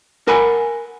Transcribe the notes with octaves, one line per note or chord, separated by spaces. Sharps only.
A#4 F#5 G#5 B5